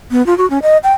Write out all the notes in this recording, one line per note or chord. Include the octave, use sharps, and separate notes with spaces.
B3
F4
F#4
C#4
D#5
G5